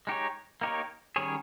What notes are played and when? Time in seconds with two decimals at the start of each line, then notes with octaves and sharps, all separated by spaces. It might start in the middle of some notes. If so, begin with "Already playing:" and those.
0.07 G#3 D#4 G4 C#5
0.61 A#3 D#4 G4 A#4 C#5
1.16 D#3 G3 C#4 G#4 C#5